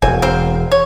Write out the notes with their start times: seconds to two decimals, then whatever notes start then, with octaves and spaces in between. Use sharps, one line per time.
0.02 E1 E2 C4 G#5
0.22 C4 A#4 C5
0.72 C#5